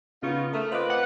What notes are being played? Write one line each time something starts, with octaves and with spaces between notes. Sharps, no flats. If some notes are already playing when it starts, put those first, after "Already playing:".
C#3 B3 D#4 F4 C#6
A3 A#4 D#6 F6
C4 F4 B4 C5 D#5 D6
F#5